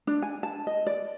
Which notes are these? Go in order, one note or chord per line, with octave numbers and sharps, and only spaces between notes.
D4
G#5
A5
D#5
D5